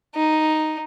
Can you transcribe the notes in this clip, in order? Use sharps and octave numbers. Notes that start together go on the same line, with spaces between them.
D#4